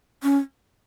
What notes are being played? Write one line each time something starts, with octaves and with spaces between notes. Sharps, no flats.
C#4